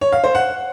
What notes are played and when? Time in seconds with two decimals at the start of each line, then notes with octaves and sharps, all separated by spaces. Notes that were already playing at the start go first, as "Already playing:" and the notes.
0.01 C#5
0.13 F5
0.24 C5
0.35 F#5